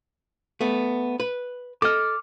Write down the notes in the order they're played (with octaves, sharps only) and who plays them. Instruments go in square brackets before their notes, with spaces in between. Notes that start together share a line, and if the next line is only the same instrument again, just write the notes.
[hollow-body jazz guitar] A3 B3
B4
[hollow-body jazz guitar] A4 D#5 [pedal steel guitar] D6 F6